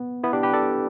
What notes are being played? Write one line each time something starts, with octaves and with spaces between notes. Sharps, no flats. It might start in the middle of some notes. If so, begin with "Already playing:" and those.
Already playing: B3
B3 E4
D4 G4
G4 B4
A4 D5